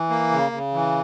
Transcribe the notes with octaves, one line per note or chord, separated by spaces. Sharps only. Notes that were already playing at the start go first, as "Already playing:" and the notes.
Already playing: E3
A#3
C#3
C#3
E3